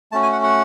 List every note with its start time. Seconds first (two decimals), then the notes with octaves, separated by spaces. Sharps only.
0.12 A3 C#4 F#4 A5
0.23 G#5
0.32 F#5
0.43 F#5